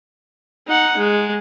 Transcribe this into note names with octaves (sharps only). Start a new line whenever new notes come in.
D#4 F#5
G#3